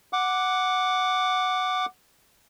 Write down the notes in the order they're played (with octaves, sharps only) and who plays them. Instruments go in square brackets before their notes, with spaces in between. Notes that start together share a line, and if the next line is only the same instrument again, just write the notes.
[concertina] F#5 D6